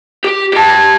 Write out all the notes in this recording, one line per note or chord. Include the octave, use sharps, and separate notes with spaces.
G4
G4 A5